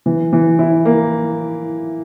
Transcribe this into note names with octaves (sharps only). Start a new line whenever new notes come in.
E3
E3
E4
A#3